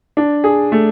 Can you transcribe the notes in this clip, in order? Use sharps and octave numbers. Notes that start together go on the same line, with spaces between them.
D4
G#4
A3